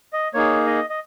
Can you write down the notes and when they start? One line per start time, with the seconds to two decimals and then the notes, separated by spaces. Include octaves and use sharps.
0.13 D#5
0.34 A#3 D#4 G#4 C#5
0.67 D#5
0.90 D#5